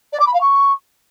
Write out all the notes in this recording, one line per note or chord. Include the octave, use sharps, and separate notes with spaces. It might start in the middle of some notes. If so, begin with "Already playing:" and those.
D5
D6
B5
F5
C#6